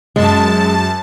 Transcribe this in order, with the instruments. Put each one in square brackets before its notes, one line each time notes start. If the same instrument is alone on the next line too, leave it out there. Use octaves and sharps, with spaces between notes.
[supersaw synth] F#2 A5 [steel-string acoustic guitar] G#3